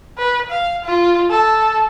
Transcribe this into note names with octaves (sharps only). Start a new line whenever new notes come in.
B4
F5
F4
A4